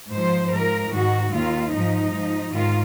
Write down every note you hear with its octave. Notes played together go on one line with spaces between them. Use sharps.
G#2 F3 C5
G#2 F3 A#4
G#2 D#3 F#4
D#2 D#3 F4
G#2 F3 D#4
G#2 F3
G#2 D#3 F4